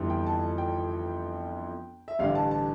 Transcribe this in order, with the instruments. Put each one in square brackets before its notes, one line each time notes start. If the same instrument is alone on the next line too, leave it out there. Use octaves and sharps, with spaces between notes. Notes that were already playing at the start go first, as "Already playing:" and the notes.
Already playing: [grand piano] G1 F2 E3 G3
G5
A5
G5
E5
A1 G2 D3 G3 F5
A5
A5